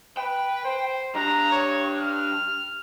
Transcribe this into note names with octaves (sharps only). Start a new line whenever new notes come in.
B4 G5
C5
G3 D4 A#5
C#5
F6